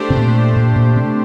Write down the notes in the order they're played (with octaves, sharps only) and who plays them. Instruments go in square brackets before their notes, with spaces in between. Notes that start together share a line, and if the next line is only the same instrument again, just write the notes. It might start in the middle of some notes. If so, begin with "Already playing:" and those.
Already playing: [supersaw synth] A3 D4 G4 C5
[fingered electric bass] C3
A#2
A#2
A#2
C3